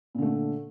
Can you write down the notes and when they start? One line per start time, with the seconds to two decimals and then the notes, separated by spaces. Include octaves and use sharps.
0.15 A#2
0.18 D3
0.22 A3